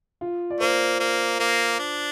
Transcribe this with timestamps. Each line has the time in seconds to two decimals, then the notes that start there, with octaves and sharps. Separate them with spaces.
0.21 F4
0.50 D5
0.60 A#3 C5
1.00 A#3
1.39 A#3
1.79 D4